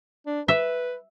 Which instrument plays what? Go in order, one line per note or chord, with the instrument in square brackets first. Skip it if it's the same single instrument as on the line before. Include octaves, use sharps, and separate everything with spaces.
[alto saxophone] D4
[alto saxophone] B4 [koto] E5